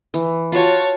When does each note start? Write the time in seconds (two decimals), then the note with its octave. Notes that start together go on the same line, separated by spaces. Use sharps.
0.14 E3
0.52 F4 F#4 C#5 A5